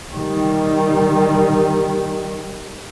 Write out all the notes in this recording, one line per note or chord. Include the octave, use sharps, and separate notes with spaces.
D#3 G3